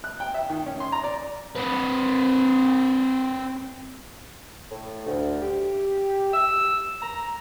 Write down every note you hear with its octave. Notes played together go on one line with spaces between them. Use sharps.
F#6
G5
E5
D#3
C#4
C6
A#5
D5
C4 B4
A2
D2
G4
E6
A#5